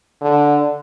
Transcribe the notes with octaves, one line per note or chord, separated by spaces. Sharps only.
D3